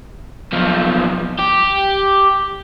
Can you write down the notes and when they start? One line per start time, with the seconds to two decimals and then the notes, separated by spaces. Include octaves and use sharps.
0.53 B1 F3
1.39 G4